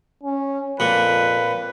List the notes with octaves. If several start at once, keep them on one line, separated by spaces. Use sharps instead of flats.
C#4
F2 A#2 B4